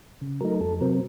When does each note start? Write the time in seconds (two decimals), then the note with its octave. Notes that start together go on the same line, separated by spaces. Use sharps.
0.21 C#3
0.41 F#3 A3 D#4 A#4
0.60 F2 A4
0.81 C3 F#3 C4 A#4